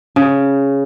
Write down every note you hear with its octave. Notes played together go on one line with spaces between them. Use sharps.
C#3